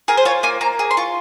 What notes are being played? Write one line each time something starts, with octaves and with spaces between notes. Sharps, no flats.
G#4 A#4
C5
F4 C#5
A#3 G#5
A#3 A#5
G#4
C6
F4 C#6